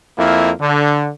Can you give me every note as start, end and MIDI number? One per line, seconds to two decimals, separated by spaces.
0.18 0.51 41
0.18 0.51 58
0.18 0.51 64
0.60 1.09 50